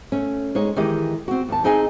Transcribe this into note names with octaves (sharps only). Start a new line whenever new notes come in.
A3 C#4
G#3 D#4 C#5
D#3 E3 G#3 G4 D#5
C4 F#4
D#2 A5
C4 D#4 G#4 D#5 G#5